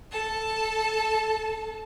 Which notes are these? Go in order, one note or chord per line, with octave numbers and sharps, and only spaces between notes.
A4 A5